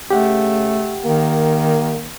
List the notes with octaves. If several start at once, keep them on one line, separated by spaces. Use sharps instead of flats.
C#3 A3 G4 F#5 G5
D#3 A#3